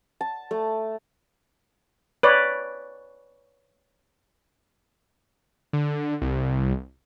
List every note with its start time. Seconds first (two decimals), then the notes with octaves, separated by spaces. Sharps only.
0.21 A5
0.51 A3
2.23 B4 C#5 D5
5.73 D3
6.22 C2